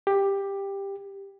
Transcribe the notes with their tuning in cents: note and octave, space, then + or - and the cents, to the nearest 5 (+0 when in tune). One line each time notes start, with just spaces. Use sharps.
G4 +10